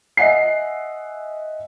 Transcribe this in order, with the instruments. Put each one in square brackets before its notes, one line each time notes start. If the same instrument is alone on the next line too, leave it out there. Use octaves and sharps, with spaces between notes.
[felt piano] D#5 E5 F#5 G#5 C7